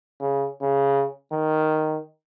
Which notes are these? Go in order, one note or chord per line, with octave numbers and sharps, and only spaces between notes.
C#3
C#3
D#3